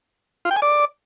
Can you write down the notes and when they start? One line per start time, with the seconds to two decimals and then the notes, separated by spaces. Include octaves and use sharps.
0.45 F4
0.51 G5
0.56 G#5
0.62 D5